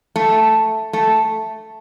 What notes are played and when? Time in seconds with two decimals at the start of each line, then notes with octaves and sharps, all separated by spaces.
0.16 A3
0.93 A3